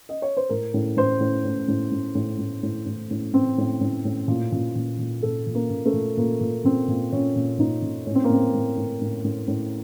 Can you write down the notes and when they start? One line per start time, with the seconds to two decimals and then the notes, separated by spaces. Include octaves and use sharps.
0.09 D#5
0.22 C#5
0.37 C5
0.49 A2 A#4
0.74 A2
0.97 A2 C5
1.21 A2
1.45 A2
1.68 A2
1.92 A2
2.15 A2
2.39 A2
2.63 A2
2.86 A2
3.11 A2
3.33 A2 C4
3.58 A2
3.81 A2
4.05 A2
4.28 A#2
4.52 A#2
4.75 A#2
4.99 A#2
5.23 A#2 A4
5.47 A#2
5.55 A#3
5.70 A#2
5.86 A3
5.93 A#2
6.17 A#2 A#3
6.41 A#2
6.64 A#2 C4
6.88 A#2
7.12 A#2 C#4
7.36 A#2
7.59 A#2 D#4
7.82 A#2
8.06 A2 C#4
8.15 C4
8.24 A#3
8.30 A2 C4
8.54 A2
8.77 A2
9.01 A2
9.24 A2
9.48 A2